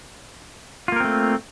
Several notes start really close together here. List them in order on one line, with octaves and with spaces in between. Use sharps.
F4 A#3 A#4 C4 A3